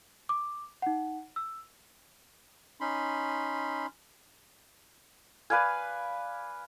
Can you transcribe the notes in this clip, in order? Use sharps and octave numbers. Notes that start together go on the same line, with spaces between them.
D6
D#4 F#5
E6
C#4 D#4 B5 C6
B4 D5 F5 G#5